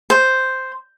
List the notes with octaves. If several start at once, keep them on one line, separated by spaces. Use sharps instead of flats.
C5